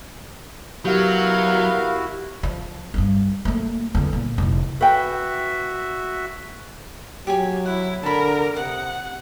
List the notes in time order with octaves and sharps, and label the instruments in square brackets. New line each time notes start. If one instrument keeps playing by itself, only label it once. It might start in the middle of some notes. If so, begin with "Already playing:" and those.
[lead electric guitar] F#3 [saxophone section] B3 A#4 F5 [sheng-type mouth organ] E4 F#4 [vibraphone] G4
[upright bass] F3
G2 D#4
A3 A#3
E2 D3
A#2
F1 E3
[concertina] F#4 E5 [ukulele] B4 G5
[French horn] F#3 [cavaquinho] G4 G#4 G#5
[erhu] E4 [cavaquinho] F#5
[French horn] D3 [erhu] A#4 [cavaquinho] A5 B5
[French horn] C3 [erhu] F#5 [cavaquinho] D#6